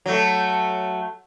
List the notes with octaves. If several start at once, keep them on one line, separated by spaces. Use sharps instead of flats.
F#3 A3